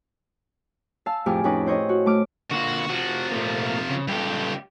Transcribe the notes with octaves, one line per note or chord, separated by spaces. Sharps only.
F5 A5 E6
F2 A2 G4 G#4 D6 F6
F2 C#4 D#4 B4 D6
E4 C5 C#5 D#5
F#4
A3 D6 F6
D3 A#3 F4 F#4
C3 F3 F#4
A#2 A3 A#3
C#3
C#2 G3 G4 A4